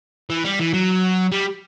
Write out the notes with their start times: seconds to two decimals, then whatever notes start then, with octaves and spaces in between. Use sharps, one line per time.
0.30 E3
0.45 G3
0.59 E3
0.74 F#3
1.32 G3